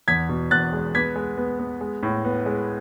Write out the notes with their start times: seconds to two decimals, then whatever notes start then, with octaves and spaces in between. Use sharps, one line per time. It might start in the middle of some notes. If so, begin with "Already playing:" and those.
0.08 E2 G#6 B6
0.29 B2
0.51 E2 F#6 A6
0.73 G#3
0.95 B3 G#6 B6
1.16 G#3
1.37 B3
1.59 B3
1.81 G#3
2.03 A2
2.25 B3
2.46 G#3